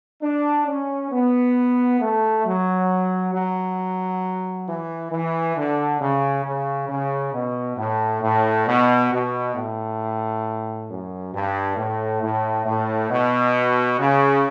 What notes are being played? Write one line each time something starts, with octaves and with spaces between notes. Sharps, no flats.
D4
C#4
B3
A3
F#3
F#3
E3
E3
D3
C#3
C#3
C#3
B2
A2
A2
B2
B2
A2
F#2
G2
A2
A2
A2
B2
C#3